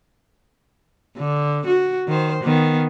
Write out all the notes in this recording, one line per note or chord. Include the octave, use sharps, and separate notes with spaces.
D3
F#4
D#3 C5
D#3 B3